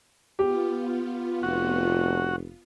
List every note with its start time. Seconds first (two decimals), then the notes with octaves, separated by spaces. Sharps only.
0.39 B3 F4 G4
1.43 F1 F#4